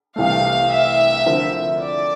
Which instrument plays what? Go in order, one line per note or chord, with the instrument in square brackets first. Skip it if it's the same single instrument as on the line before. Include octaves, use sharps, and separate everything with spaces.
[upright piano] C2 C3 E3 A3 [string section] F5
[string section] E5
[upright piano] D3 F3 C4 E4 A#4
[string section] D5